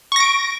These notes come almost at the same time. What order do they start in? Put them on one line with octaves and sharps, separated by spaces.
C#6 A#6 D7